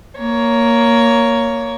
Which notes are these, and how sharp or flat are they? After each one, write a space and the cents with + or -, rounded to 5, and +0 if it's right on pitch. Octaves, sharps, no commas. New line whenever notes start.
A#3 +0 C#5 +15